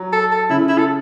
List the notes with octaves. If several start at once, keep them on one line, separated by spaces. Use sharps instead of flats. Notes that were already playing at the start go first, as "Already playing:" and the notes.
Already playing: F#3
A4
A4
C#3 E4
E4
A4